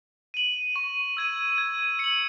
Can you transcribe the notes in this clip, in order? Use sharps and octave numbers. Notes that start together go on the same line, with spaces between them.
D#7 F#7
C#6
E6 G#6 D#7
G#6
C#7 F#7